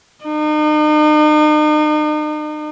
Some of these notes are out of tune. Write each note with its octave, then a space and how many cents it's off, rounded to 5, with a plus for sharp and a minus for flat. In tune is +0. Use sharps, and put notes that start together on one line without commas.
D#4 -40